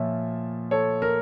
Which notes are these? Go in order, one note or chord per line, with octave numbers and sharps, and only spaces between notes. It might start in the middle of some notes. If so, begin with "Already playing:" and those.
Already playing: A#2 F3 C#5 E5
A4 C#5
A#4